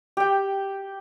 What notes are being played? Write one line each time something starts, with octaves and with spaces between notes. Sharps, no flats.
G4 G5